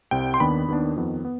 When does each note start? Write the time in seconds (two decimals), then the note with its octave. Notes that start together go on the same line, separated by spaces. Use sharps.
0.11 C2 C3 G3 C4 G5
0.34 C6
0.40 D#2 D#3 B3 D4 B5
0.68 D#2 D#3 B3 D4
0.96 F2 D#3 B3
1.25 B3